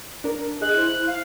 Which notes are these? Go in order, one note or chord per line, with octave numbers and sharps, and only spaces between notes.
D4 A#4
G#4 D#5 F#6
E4 C5
F5